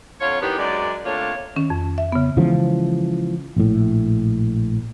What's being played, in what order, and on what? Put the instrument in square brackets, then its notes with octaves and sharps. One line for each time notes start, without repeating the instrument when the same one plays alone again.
[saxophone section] F2 D3 F4 C#5
D#3 E3 B3 D4 G4
F#2 G#3 D4 D5
D3 A3 A#3 C4 F4 C#5
[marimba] D#3 C#4
F2
E5
C#3 B3
[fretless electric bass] C#3 E3 F3 G#3
A#1 A2